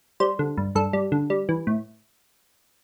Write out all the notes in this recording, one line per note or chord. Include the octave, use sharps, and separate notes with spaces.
G3 C5
D3
G2
G2 A4
G3
D3
G3
E3
A2